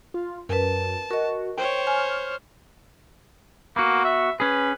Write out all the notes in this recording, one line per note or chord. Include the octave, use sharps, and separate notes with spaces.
F4
F#2 A#4 B4 A5
F#4 A#4 D#5
C5 C#5 G5
G#5 F6
A#3 B3 F#4
E5
C#4 G#4 B4